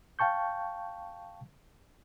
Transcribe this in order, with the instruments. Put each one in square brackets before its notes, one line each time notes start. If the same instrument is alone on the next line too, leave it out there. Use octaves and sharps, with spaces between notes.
[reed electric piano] F5 G5 A5 C#6 G6